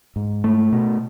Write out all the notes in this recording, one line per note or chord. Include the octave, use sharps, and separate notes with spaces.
G#2
A3
B2